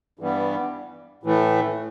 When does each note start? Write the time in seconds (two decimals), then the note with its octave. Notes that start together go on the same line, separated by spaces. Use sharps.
0.19 G2 E3 G3 B3
1.23 A2 E3 A3